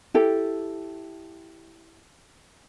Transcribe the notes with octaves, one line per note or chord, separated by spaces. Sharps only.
E4 G4 A4